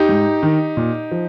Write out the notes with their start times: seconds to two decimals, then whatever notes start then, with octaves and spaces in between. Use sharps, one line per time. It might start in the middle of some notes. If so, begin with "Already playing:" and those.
Already playing: D#4 G4
0.09 G#2
0.43 D#3
0.77 A#2
1.11 F3